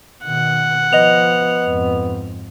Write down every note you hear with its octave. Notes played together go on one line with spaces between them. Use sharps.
B2 D#3 F#5
F3 B3 D#5 F7
F2 G#2